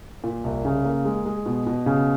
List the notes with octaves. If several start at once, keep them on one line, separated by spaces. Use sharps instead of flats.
A#2
C2
C#3
A#3
G#3
G#3
B2
B2
C#3